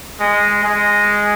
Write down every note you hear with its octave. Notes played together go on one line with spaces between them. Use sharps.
G#3
G#3